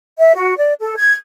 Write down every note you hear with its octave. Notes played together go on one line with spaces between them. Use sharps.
E5
F#4
D5
A4
G#6